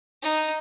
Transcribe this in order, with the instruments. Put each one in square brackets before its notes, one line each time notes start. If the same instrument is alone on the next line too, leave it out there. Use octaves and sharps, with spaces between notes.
[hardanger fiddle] D#4